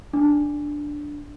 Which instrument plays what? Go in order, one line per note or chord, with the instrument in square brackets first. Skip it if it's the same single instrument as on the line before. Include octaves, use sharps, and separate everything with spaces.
[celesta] D4